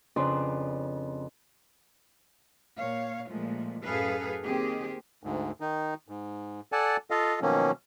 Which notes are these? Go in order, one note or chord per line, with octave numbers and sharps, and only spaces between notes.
F2 C#3 D4 B4 C6
A#2 C#5 F5
A#2 F3 G#3 A3
F#2 A2 G#4 A4 B4 F5
D#3 A#3 C4 G4 G#4
D2 G#2
D#3 D#4
G#2
A4 D5 F#5 G#5 A5
F4 A4 D#5 F5
B2 D#3 F3 F#3 A#3 C#4